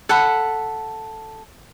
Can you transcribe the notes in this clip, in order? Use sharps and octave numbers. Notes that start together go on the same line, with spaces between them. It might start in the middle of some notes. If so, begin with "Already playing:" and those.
A4 F#5 B5